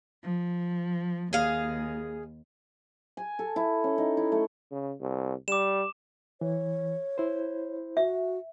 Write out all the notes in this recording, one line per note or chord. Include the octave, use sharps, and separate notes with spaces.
F3
D#2 G#4 F5
G#5
A4
E4
C#4
D#4
E4
A3
C#3
C2
G3 D6 E7
E3 C#5
E4 C5
F#4 E5